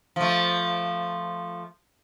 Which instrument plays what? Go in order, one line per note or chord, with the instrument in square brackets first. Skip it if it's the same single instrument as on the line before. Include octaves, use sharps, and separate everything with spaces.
[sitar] F3 A3